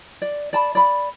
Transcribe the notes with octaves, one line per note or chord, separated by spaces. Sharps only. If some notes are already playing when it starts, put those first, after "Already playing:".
D5
D5 A5 B5
D5 B5